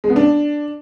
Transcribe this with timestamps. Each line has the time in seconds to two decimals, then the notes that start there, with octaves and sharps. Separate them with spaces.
0.04 G#3
0.10 B3
0.16 D4